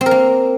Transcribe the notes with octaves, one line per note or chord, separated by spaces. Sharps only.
C4
A#4
A#3